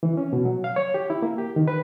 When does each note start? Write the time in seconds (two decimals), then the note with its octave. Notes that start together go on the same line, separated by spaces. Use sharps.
0.03 E3
0.17 C#4
0.33 B2
0.45 F#3
0.64 F5
0.76 C#5
0.94 G4
1.10 E4
1.22 A#3
1.38 G4
1.56 D#3
1.68 B4